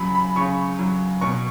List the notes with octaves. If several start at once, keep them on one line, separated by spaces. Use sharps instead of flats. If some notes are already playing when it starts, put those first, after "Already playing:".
Already playing: C#3 F#3 B5
B5
C#3 C#6
F#3
B2 C#6